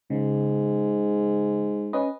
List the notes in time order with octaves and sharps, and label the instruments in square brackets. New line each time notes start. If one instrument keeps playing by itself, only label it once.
[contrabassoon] G#2 [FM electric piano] C#3
[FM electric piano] C#4 B4 D#5